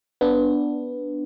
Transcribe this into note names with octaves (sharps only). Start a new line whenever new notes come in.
B3 D4